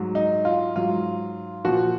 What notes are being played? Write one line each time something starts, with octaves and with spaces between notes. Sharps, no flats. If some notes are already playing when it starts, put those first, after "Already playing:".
Already playing: G#2 F#3
D#4
F4
G#2 F#3 F4
A#2 F3 F#4